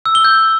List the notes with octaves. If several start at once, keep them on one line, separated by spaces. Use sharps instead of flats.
E6
G7
G6